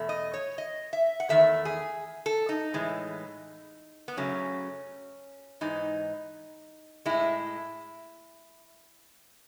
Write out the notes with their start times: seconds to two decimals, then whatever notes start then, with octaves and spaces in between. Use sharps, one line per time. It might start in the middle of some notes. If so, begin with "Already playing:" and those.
Already playing: E2 B2 A3
0.09 D#5
0.34 C#5
0.58 D#5
0.93 E5
1.20 F#5
1.29 E2 D#3 A3 E5
1.65 G#4
2.26 A4
2.49 D#4
2.74 A2 E3 G#3
4.08 B3
4.17 F#2 C#3 F#3 A3 C#4
5.61 G#2 E3 G#3 D#4
7.06 A2 G#3 E4